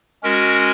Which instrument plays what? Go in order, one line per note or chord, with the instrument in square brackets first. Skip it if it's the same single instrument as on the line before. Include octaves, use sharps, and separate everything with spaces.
[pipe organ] G#3 C#4 F#4 A#4